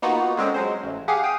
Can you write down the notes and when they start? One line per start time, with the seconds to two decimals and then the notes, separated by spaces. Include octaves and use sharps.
0.02 A#3 B3 D#4 F4 F#4
0.37 D3 G#3 C4 C#4
0.54 F#3 G#3 C5
0.83 A1
1.08 G4 G#4 F5 F#5 G#5
1.23 F5 G5 D#6